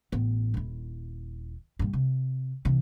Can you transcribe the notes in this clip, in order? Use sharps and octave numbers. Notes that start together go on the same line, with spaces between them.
A1 B3
D#1 E4
G2 A#2
C3
C3 E3